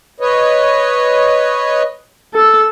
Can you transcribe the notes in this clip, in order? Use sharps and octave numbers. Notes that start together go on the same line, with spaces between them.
B4 C#5 D#5
A4 E6